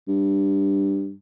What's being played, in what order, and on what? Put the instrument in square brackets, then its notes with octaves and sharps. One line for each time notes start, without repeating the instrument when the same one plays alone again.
[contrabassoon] G2